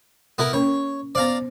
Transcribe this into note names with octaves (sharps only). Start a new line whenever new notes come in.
B3 E4 A#4
A#3 C#4 A#4 C#5
B3 C5 D5 F5 A#5